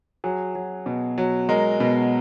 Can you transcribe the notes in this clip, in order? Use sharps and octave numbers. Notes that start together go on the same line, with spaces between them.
F#3 G#4
F#3
B2
F#3
G#3 A#4
B2